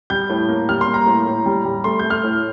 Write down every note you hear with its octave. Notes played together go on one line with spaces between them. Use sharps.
G3 G6
A2
A#3
G3 F6
C6
A#3
A#5
A2
A2
G3
G3
A3 C6
A3 G6
F6
A2